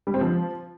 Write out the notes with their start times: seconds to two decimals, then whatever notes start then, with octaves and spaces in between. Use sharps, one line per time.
0.07 G3
0.14 C4
0.21 F3